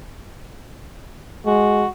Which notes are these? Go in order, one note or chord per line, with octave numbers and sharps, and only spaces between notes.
G#3 F#4